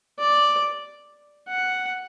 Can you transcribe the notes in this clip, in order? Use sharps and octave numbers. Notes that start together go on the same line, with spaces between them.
D5
F#5